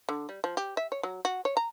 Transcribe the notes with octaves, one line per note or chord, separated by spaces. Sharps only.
D3
G3
F3
G4
E5
C#5
F#3
F#4
C#5
A#5